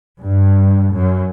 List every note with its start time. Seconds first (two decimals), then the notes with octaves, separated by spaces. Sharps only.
0.22 G2
0.94 F#2